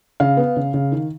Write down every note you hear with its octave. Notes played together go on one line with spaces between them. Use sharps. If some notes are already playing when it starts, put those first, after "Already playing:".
C#3 F5
B3
C#3
C#3
D#3